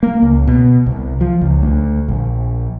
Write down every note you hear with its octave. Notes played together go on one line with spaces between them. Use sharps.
A#3
C#2
B2
C2
F3
C#2
D2
A#1